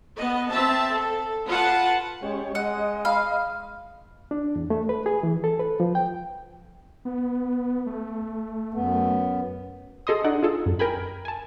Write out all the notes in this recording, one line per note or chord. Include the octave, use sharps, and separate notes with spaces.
B3 D#5
C4 E5 A5
A4
F4 B4 F#5 A5
G#3 C#4 G4 C#5
G#3 D#5 F#5
F5 B5
D4
E2
A3
B4
G#4
E3
A4
B4
F3
G5
B3
A3
F#2 B3
G#4 A4 D#5 C6 D#6
D4 D#4 D5 D#5 F#5
F4 G#4 A4
F#2
A#4 G5 G#5 B5
G#5 A5